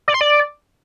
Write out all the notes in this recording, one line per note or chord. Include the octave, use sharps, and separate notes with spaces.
D5
C6
D5